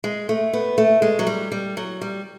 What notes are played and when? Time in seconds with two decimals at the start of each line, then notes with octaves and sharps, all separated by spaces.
0.04 G#3
0.29 A3
0.53 B3
0.78 A3
1.02 G#3
1.19 F#3
1.27 G3
1.52 G3
1.77 F#3
2.01 G3